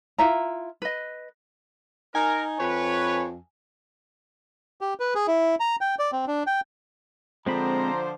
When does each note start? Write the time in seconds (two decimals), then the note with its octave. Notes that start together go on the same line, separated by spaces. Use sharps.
0.18 E4 F4 E5 A#5
0.82 B4 D#5
2.15 D#4 A#4 G#5
2.60 F2 B4 C#5
4.81 G4
5.00 B4
5.15 G#4
5.27 E4
5.60 A#5
5.81 G5
5.99 D5
6.12 C4
6.27 D4
6.47 G5
7.46 D3 F3 G#3 C4 C5 A#5 B5